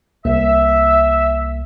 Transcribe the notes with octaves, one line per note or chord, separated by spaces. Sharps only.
C2 A#3 E5